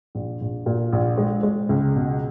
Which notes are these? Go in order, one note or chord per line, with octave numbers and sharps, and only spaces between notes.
A#1
A#1
A#2
A#1
G#3
G#3
C#2
B2